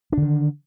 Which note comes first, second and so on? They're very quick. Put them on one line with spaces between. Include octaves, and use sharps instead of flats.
D4 D3 D#3